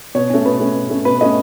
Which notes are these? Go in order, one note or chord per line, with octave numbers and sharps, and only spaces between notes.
B2 C#5
A3 C#4
B2 B4
A3 C#4
B2
A3 C#4
B2 B4
A3 C#4 D#5